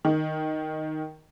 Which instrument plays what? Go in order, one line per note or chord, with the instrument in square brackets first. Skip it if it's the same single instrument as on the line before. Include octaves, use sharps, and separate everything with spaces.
[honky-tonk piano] D#3